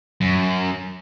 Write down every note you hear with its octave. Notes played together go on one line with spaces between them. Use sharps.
F#2